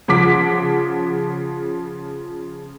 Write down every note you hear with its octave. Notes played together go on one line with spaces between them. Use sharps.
C#3 F3 F#5 D6 B6